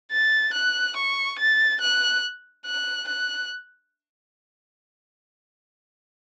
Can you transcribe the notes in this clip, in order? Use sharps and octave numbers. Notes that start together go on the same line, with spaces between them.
A6
F#6
C#6
A6
F#6
F#6
F#6